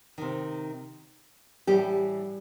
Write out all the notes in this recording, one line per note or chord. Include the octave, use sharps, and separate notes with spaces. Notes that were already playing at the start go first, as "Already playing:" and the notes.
C3 D#3
A2 E3 G3 G4